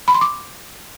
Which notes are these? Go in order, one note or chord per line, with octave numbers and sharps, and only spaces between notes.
B5
C6
D6